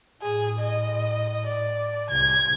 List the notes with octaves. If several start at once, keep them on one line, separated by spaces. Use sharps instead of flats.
A2 G#4
D#5
D5
C2 G#6